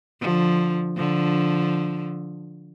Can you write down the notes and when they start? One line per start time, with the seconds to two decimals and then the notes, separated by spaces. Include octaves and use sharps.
0.21 D3 F3
0.97 D3 F3